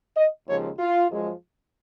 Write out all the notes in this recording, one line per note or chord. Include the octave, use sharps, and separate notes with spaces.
D#5
D#2 C#3 F3 G#3 C#5
F4
F#2 F3 G#3